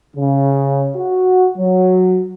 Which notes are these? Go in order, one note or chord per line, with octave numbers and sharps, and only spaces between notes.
C#3
F#4
F#3